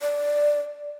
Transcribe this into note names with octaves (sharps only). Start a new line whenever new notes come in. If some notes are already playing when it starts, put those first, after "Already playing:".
D5